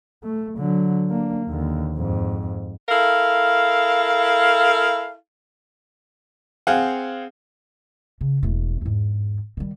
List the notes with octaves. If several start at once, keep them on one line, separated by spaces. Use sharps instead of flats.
A3
D3 F#3
A#3 D4
D#2 D3
F2 G#2
E4 A4 A#4 F5
C4 G#4 F5 F#5
C#3
E1 A3
E2 G#2
D#3 G3